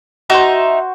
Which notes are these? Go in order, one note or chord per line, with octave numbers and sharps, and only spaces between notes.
D#4 F#4 C5 E5 A#5